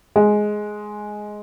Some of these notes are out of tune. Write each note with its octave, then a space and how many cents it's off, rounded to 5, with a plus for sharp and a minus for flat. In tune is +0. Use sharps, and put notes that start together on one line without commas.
G#3 +5